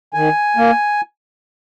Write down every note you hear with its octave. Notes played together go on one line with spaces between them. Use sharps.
D#3 G#5
A#3